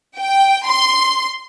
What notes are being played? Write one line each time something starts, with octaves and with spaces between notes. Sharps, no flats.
G5
C6